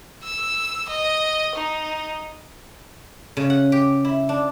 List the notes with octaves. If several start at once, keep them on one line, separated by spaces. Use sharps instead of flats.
E6
D#5
D#4
C#3
F#5
G4
E4
D4